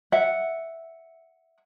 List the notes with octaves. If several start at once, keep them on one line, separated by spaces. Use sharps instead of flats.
E5 F#5